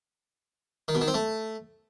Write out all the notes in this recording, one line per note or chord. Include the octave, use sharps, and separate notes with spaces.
D#3
B2
D#3
C4
A3